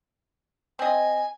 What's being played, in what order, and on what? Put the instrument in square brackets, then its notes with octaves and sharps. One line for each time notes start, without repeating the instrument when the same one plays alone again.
[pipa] C4 D#5 [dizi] G#5